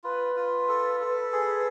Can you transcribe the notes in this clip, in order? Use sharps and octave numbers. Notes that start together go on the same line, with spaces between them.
F4 B4
F4
A4
A4
G#4